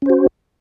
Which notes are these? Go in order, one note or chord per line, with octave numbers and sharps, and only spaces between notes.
C#4 F#4 C5